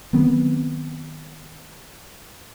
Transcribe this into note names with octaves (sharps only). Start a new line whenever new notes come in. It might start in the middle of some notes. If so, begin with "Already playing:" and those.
D#3 F#3 B3 C4